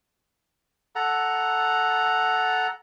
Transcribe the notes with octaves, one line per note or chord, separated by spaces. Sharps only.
A4 F#5 A#5